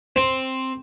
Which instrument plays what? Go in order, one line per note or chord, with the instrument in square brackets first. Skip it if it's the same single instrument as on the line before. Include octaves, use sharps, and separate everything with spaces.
[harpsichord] C4